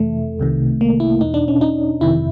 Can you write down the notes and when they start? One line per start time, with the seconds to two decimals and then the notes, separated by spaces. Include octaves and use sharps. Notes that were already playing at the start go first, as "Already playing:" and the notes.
Already playing: F2 C3 E3 A3
0.40 C2 C3 D#3
0.81 A#3
1.00 E4
1.21 E2 B2 D#4
1.34 D4
1.48 C#4
1.61 D#4
2.01 G1 F2 C3 D#3 E4